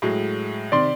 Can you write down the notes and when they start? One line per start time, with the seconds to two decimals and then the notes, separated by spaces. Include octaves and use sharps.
0.02 A2 F#3 G#3
0.72 C3 D#3 D5 C6